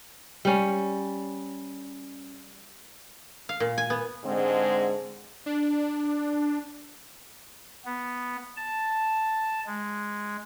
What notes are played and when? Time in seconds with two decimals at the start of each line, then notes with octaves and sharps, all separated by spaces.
0.45 G3 C#4
3.49 F5
3.60 A#2
3.78 G#5
3.90 B3
4.24 G#2 D3 G#3 C4
5.46 D4
7.85 B3
8.57 A5
9.66 G#3